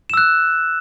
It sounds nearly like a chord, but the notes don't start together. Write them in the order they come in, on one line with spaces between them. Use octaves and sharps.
E7 E6 F#6